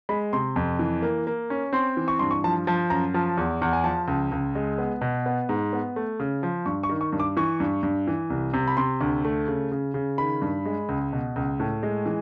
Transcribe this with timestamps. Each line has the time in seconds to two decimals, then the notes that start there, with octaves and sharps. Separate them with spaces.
0.09 G#3 B5
0.33 C3 C6
0.56 F2
0.79 E3
1.02 A#3
1.27 A#3
1.50 C#4
1.73 C4 C6
1.97 E3
2.08 C#6
2.19 G2 C6
2.31 C#6
2.44 F3 A5
2.67 F3 A5
2.90 F#2 A#5
3.14 F3 A5
3.37 E2
3.62 E2
3.73 G#5
3.84 F3 A5
4.08 C#2
4.32 C#2
4.55 G#3
4.78 B3
5.01 B2
5.26 B3
5.49 G#2
5.73 B3
5.96 A3
6.20 C#3
6.43 F3
6.66 G2 C#6
6.83 C#6
6.89 D#3
7.01 C#6
7.12 G2
7.20 D6
7.37 E3 C#6
7.60 G2
7.83 G2
8.08 E3
8.30 C2
8.54 C3
8.68 B5
8.77 C3 C6
9.01 D2
9.25 A3
9.48 C#3
9.72 C#3
9.94 C#3
10.18 D#3 B5
10.42 G2
10.66 G#3
10.89 C#2
11.13 B2
11.36 C#2
11.60 A2
11.83 G#3
12.06 E3